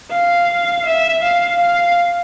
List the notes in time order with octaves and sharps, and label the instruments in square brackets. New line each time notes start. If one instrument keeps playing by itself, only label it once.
[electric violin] F5
E5
F5
F5